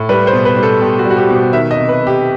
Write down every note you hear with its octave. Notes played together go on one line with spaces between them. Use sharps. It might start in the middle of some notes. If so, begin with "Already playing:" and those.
Already playing: A2
G3 B4
C5
B2
B4
G3
A4
B2 G4
F#4
G3
F#4
G4
B2
G4
D#3 E5
D#5
C3
B4
C3
G4